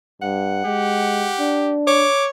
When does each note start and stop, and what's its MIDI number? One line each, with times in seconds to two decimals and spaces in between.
0.22 0.64 43
0.22 1.66 78
0.65 1.32 56
0.65 1.76 67
1.39 2.07 62
1.87 2.28 73
1.87 2.26 86